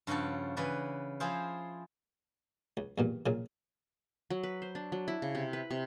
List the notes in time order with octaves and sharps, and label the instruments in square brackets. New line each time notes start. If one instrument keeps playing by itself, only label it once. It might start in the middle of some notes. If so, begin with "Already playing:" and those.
[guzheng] G2 C#3 F3 F#4 A4
C#3 E3 B4 D5
F3 E4 G#4 C5 F5
[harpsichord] C#2
E2 G2 A#2
A#1 A#2 C#3
[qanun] F#3
B4
C5
D4
F#3
E4
C#3
C3
B4
C3